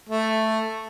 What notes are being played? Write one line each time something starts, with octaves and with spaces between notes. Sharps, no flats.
A3